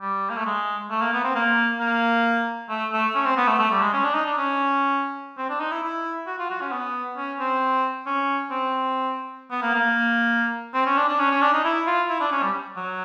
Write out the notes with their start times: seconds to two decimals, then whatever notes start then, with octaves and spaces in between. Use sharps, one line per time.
0.01 G3
0.30 A#3
0.37 A3
0.46 G#3
0.90 A3
1.01 A#3
1.14 B3
1.24 C4
1.36 A#3
1.80 A#3
2.70 A3
2.92 A3
3.15 C#4
3.25 C4
3.37 B3
3.48 A3
3.59 A3
3.71 G3
3.82 G#3
3.93 C#4
4.04 D4
4.14 D#4
4.26 D4
4.38 C#4
5.38 C4
5.50 D4
5.60 D#4
5.71 E4
5.83 E4
6.27 F#4
6.39 F4
6.50 F#4
6.61 C#4
6.72 B3
7.17 C#4
7.39 C4
8.06 C#4
8.51 C4
9.51 B3
9.62 A#3
9.74 A#3
10.74 C4
10.86 C#4
10.97 D4
11.08 D4
11.19 C#4
11.31 C#4
11.42 D4
11.53 D#4
11.64 E4
11.86 F4
12.09 E4
12.20 D4
12.32 C#4
12.42 G3
12.76 F#3